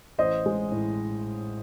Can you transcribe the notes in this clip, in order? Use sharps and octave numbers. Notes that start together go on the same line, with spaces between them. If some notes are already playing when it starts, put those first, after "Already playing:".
A1 C5 D#5
G#3
A2